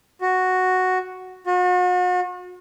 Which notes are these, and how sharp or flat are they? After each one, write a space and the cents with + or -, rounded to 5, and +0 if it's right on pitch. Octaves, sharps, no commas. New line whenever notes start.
F#4 +0
F#4 -40